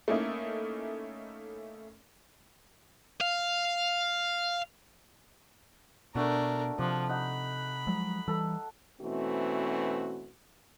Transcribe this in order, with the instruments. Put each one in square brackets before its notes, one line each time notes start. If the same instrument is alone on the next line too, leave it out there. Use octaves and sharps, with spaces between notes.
[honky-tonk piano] A3 A#3 C#4 D#4 E4
[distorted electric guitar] F5
[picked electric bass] B2 [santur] A3 F#4 [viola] D4 A#4
[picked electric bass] C3 [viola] F3 [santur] D4
[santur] D#4 F#5 [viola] B5
[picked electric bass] F3 F#3 G#3
[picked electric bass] E3 G3 [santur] A4
[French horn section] B2 E3 A3 C4 C#4 F#4